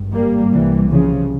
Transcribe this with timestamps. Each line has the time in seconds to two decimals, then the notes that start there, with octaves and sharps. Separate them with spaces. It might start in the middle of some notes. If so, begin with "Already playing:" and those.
Already playing: G#1 G2
0.13 G3 A#3
0.51 C2 C3 E3 G3
0.90 C#3 F3